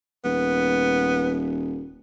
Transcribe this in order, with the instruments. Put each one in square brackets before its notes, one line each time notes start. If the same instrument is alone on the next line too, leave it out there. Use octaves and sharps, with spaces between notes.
[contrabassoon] D#1 [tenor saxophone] B3